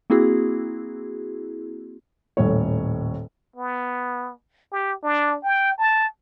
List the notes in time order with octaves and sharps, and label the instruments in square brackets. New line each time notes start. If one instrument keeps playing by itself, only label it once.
[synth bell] A#3 C4 E4 F#4 G#4
[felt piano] D#1 A2 C#5
[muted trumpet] B3
G4
D4
G5
A5